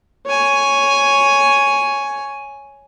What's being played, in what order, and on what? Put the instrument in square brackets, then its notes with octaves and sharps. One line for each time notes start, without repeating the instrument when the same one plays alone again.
[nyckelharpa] C#5 G#5